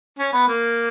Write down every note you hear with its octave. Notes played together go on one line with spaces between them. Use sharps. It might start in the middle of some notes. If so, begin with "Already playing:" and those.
C#4
B3
A#3